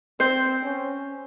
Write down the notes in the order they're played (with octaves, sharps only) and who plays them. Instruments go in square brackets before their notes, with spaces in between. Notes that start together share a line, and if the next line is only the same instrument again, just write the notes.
[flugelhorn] C4 [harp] C5
[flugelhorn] C#4